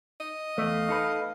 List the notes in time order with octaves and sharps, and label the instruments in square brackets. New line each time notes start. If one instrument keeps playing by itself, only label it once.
[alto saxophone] D#5
[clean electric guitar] E2 A3 [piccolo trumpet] F5
[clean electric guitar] D#4 A4 B4